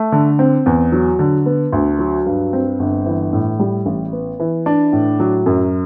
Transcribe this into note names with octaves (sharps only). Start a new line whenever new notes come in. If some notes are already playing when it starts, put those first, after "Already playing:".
Already playing: A3
D3
C4
E2
F#3
D3
B3
D2
F#3
G2
C4
G1
E3
A2
G3
A1
B3
E3
D4
A2
F#3
F#2